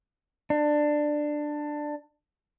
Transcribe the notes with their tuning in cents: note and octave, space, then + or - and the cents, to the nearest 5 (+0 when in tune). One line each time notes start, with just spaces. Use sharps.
D4 +15